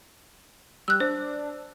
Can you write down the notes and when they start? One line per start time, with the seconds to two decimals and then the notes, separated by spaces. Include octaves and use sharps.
0.88 G3 E6 F#6
1.00 D4 C5